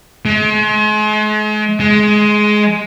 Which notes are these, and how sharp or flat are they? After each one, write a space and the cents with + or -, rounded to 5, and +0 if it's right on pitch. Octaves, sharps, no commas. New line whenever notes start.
G#3 +40
G#3 +15